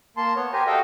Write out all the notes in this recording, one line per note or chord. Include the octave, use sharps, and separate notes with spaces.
A#3 A5 C6
B3 C#5
G4 A#4 C5 G#5 A#5
F#4 A4 D#5 F5 G5